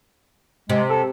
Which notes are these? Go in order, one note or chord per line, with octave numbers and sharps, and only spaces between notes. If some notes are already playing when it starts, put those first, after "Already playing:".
C3 G#3
A4